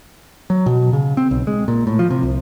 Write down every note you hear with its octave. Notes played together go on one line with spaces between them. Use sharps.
F#3
B2
C#3
C4
B1
G#3
A#2
A2
F3
C3
C2